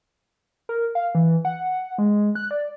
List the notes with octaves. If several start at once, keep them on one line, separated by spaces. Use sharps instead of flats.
A#4
F5
E3
F#5
G#3
F#6
D5